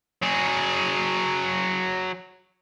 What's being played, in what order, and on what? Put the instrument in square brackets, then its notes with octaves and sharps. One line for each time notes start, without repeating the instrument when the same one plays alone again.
[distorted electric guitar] F#3 G#4